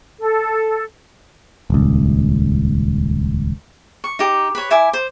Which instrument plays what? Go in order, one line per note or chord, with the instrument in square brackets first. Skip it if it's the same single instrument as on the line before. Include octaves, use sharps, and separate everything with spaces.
[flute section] A4
[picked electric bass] D#1 C#2
[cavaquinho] C#6
D#4 G4
B4 C#5
E4 E5 G#5 D6
C5